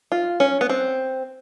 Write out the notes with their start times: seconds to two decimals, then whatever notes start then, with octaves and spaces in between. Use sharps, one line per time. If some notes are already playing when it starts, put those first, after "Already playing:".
0.12 F4
0.40 C#4
0.61 B3
0.69 C4